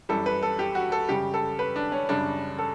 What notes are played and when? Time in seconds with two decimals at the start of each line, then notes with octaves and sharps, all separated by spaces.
0.09 F#2 E3 G3 A4
0.26 B4
0.43 A4
0.59 G4
0.75 F#4
0.92 A4
1.09 F#2 C#3 G3 G4
1.34 A4
1.59 B4
1.76 D4
1.92 C#4
2.09 F#2 C#3 G3 D4
2.59 A4